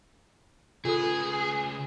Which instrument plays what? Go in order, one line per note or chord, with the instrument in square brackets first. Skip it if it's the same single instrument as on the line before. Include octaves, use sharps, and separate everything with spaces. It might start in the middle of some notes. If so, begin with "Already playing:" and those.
[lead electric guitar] C#3 B4 [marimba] F4 A4 D#6 [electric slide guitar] G#4